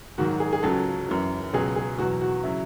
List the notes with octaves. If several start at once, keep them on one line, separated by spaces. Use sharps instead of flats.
G#2 D#3 F#3 F#4
G#4
G#4
C#2 C#3 F#3 A4
F#2 E3
C#2 B2 F#3 G#4
G#4
E2 B2 F#3 F#4
F#4
C#3 F#3 E4